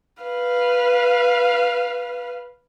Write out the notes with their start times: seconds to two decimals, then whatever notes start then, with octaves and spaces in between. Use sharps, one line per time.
0.23 B4 F5